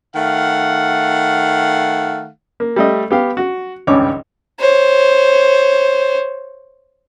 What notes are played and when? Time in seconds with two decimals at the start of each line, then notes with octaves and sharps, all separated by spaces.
0.15 D#3 A3 F5 F#5
2.60 A#3
2.76 G3 A3 D#5
3.11 B3 G4 F5
3.37 F#4
3.87 G#1 C#2 G2 C#3 C#5 D6
4.59 C5 C#5